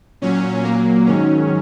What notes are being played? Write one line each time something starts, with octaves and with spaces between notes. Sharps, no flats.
A#2 F#3 C#4
A#2 F#3 A#3
G#2 D#3 F#3 C#4